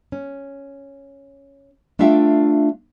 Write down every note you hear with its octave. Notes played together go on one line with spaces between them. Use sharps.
C#4
A3 D4 F4 E5 F5 G5